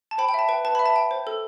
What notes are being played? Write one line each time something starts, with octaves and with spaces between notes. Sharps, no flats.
A5
C5 G5 B5
G5
E5 A5
B4 G5
B4 A5
E5 B5
A5
G5
C5
A4